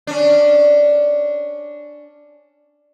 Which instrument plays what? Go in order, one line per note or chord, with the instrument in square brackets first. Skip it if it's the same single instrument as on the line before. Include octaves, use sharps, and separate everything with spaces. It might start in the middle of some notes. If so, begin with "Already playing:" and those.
[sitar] C#4 D4